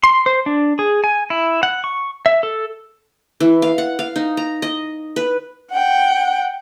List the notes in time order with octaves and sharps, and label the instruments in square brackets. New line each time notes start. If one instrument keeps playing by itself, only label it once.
[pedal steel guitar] C6
C5
D4
G#4
G#5
E4
F#5
C#6
E5
A4
[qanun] E3
F5
F#5
F5
D#4
A#5
D#5
B4
[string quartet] F#5 G5